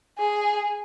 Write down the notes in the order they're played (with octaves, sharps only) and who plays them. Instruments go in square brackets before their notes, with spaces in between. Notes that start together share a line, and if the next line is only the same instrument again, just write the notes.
[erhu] G#4